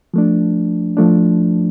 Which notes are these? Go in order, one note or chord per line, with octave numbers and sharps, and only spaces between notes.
F3 A3 D4
F3 A3 D4